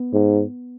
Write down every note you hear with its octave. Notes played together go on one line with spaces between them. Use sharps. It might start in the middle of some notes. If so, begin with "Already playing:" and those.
Already playing: B3
G#2